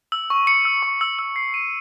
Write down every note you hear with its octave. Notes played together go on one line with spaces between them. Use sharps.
E6
C#6
C#7
E6
C#6
E6
E6
C7
D#7